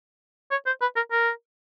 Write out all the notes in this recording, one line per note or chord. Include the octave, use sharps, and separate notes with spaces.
C#5
C5
B4
A#4
A#4